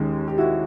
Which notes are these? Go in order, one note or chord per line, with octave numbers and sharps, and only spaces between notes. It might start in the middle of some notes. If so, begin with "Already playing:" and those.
Already playing: D#2 D#3 G#3 C#4
G4
E4 F#4